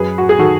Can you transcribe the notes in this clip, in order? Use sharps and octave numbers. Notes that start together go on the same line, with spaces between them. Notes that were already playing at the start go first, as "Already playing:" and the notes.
Already playing: F#2 G#4 B4
F#4
G#4
D#3 F#4 A4